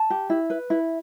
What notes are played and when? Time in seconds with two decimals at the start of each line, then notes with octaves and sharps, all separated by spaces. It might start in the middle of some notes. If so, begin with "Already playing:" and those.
Already playing: A5
0.10 G4
0.30 E4
0.50 B4
0.70 E4